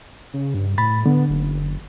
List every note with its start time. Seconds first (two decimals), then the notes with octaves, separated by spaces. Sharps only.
0.34 C#3
0.54 G2
0.78 A2 B5 A6
1.06 D3 B3
1.30 F#1